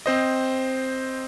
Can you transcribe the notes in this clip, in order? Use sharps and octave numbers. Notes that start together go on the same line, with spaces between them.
C4 C5 D#5